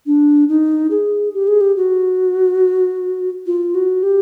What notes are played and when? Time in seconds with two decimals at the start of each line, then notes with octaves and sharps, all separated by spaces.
0.06 D4
0.49 D#4
0.91 G#4
1.34 G4
1.47 G#4
1.61 G4
1.77 F#4
3.46 F4
3.75 F#4
4.03 G4